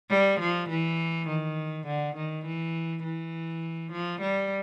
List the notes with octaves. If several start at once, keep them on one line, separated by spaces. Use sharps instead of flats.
G3
F3
E3
D#3
D3
D#3
E3
E3
F3
G3